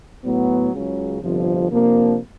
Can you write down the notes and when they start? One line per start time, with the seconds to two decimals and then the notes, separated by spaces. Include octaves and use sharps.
0.24 A2 F#3 B3
0.72 C#2 C#3 F#3
1.21 G1 F2 C3 F3
1.69 C3 F3 A#3 D4